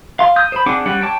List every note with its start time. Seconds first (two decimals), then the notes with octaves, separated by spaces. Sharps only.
0.19 F5 C6
0.36 D#6 G6
0.52 C5 B5
0.66 C4 D4 G#4 F#5 D6
0.86 G3 C#4 F#5
1.01 C#5 G5 A5 D6